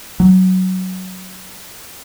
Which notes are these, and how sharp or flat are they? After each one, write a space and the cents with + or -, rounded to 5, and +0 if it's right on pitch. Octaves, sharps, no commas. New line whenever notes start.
F#3 +10